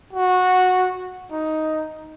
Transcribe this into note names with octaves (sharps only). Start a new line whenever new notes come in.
F#4
D#4